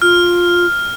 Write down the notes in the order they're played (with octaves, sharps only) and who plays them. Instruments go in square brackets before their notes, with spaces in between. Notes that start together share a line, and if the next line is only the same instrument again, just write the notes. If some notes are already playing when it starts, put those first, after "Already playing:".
[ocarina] F4 [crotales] F6